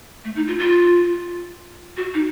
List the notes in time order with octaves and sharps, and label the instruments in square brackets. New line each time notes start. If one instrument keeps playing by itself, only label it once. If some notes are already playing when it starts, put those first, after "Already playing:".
[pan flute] A3
D#4
F4
F4
F#4
D#4